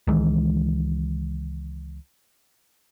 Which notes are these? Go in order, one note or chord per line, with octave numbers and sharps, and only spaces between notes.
C#2 D#3 E3 G#3